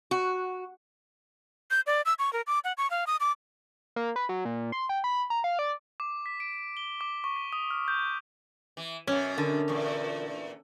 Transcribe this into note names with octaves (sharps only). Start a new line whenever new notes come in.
F#4
G6
D5
E6
C#6
A#4
D6
F#5
C#6
F5
D#6
D6
A#3
B4
F#3
A#2
C6
G5
B5
A#5
F5
D5
D6
B6
D7
G7
D6
C#6
B6
D#6
F6
G6
E3
F#2 B2 C#4
D3 A#4
E2 A#2